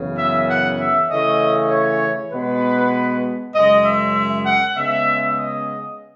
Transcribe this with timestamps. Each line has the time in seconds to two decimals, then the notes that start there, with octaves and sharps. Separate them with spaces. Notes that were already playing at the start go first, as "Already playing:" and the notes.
Already playing: F#2 C#3 E3 B3
0.18 E5
0.50 F#5
0.80 E5
1.10 C#3 E3 A3 C#4 D#5
1.71 C#5
2.32 B2 G#3 B3 B4
3.54 F#2 C#3 G#3 D#5
3.85 E5
4.46 F#5
4.76 C#3 G#3 B3 E5
5.37 D#5